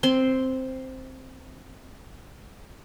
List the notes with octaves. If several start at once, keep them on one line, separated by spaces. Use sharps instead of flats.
C4 C6